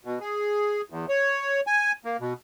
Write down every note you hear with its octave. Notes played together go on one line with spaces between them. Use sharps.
B2
G#4
E2
C#5
G#5
A#3
B2